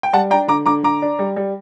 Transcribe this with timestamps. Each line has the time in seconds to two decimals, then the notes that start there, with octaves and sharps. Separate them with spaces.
0.03 G5
0.13 G3 F#5 A5
0.30 D4 G5 A#5
0.48 D3 A#5 D6
0.66 D3 A#5 D6
0.83 D3 A#5 D6
1.02 D4
1.19 G3
1.36 G3